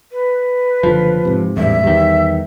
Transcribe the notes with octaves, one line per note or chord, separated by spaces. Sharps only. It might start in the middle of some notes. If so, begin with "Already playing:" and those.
B4
F#1 D3 F3
G#2 C3
A1 E2 G2 E5
E2 D#3 G3